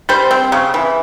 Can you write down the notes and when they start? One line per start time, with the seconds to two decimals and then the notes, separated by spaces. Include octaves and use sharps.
0.09 G3 C5
0.31 C4
0.52 C#3
0.74 E3